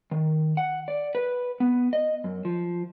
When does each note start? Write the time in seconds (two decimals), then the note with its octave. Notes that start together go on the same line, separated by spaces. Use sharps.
0.11 D#3
0.57 F#5
0.88 D5
1.15 B4
1.60 B3
1.93 D#5
2.24 F#2
2.45 F3